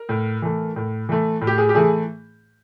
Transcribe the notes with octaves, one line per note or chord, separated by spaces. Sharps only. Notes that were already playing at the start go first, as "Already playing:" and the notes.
Already playing: A#4
A2
E3 A3
A2
E3 A3
A2
G4
G#4
G4
E3 A3 G#4